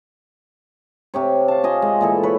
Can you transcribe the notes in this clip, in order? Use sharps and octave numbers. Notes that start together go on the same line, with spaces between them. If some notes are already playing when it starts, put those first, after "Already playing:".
C3 G4 C#5
F5 A5
F4 D#5 G#5
G#3
A#2 E3 A4
B4 C#5